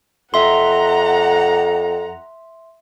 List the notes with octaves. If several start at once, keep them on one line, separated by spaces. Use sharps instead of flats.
F2 E5 F#5 A#5 C6